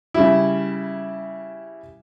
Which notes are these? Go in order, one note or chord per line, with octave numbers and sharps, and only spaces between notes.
C#3 G3 E4